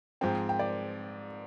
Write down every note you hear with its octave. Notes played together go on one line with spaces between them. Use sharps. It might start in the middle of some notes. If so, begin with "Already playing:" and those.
G#2 F3 C4 G5
G5
D5